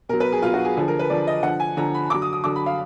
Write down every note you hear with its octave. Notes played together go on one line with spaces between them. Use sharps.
B2 F#3 A#4
B4
G#4
B2 F#3 F4
F#4
G#4
D3 F3 G#4
A#4
B4
D3 F3 D5
D#5
D3 F3 F#5
G#5
D3 F3 A#5
B5
D3 F#3 D6
D#6
D#6
D3 F#3 D6
B5
F5